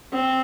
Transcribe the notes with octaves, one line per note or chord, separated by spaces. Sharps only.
C4